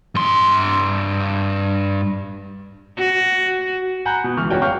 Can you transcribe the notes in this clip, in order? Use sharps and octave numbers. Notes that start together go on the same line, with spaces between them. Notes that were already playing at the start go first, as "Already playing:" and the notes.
G2 C6
F#4
F#5 G#5 A#5 B5 F#6 G6
B2
C#2 E3 C#6 F6
G1 C#4 F#4 G5
F5 G5 C#6 F6 G6